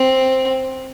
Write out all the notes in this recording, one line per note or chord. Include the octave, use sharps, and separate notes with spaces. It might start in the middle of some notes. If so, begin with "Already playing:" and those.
Already playing: C4